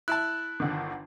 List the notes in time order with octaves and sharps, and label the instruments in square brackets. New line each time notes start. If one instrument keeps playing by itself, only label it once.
[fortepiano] E4 E5 A5 [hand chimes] F#6
[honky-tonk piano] G1 D3 D#3